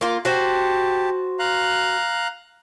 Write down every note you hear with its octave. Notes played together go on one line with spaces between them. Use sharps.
A#3 F4
F#4 G4 C5 A5
F5 A#5 F#6